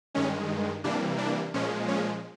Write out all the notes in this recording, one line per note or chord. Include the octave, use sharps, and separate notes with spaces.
G2 D#3 G#3 C#4
C3 E3 G3 A#3 D4
D4
A#2 F3 G#3 C#4
C#4